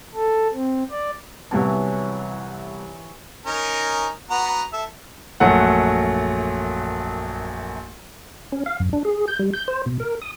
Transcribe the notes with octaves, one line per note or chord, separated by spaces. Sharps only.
A4
C4
D5
C2 E3 F#3 B3 A5
C#4 D#4 A#4
B3 F#4 A#5
A4 E5
A#1 F#2 F#3 A3 F#5
C#4
F5
F#2
D4
G#4
G6
G3
G6
C5
B2
A#4
D#6